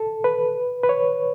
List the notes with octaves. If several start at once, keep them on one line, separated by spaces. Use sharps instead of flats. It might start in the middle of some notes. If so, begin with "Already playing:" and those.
Already playing: A4
B4
B4
C#5